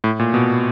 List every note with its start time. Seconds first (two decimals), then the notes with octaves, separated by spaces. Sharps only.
0.04 A2
0.19 A#2
0.34 B2